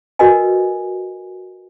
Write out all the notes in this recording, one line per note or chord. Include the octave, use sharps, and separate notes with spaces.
F#4 A#4 B4 D#5 G#5